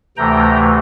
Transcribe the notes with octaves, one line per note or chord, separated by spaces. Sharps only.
D2 C3 E3 A3 G5 A#5